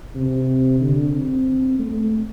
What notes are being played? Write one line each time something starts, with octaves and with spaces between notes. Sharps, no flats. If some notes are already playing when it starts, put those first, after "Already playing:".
C3
D3
C4
A3